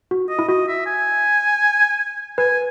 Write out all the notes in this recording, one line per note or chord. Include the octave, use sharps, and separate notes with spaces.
F#4
D#5
E4
F#4 D#5
E5
G#5
B4 G#5